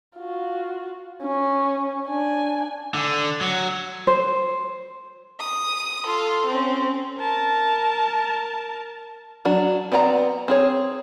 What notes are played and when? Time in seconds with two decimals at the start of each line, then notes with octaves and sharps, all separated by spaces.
0.18 F4 F#4
1.23 C#4
2.07 D4 G#5
2.94 D3
3.41 F#3
4.07 C5
5.40 D#6
6.06 F4 A4
6.47 C4 C#4
7.18 A#4 A5
9.45 F#3 D4 F#4
9.92 B3 C4 D5 G5 A#5
10.48 C4 G#4 C#5